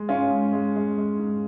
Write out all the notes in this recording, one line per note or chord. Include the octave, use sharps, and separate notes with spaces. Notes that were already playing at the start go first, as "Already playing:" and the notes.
Already playing: G#3
G#2 C#4 F4
G#2
G#3
G#3
G#3
G#2